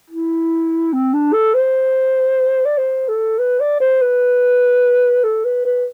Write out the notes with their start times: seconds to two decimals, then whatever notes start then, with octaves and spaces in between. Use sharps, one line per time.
0.10 E4
0.93 C4
1.14 D4
1.33 A4
1.54 C5
2.65 D5
2.78 C5
3.08 A4
3.39 B4
3.60 D5
3.80 C5
4.01 B4
5.24 A4
5.45 B4
5.65 B4